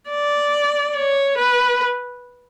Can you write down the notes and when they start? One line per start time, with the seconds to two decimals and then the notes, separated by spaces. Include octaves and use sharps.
0.09 D5
0.95 C#5
1.38 B4